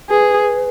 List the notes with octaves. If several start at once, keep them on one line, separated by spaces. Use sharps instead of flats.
G#4 B4